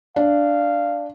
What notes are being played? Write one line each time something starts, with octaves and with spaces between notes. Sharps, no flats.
D4 F5